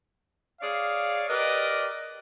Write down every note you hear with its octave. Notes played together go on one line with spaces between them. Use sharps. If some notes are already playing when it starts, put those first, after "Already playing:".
G#4 C#5 D5 F5
G4 A#4 B4 D5 D#5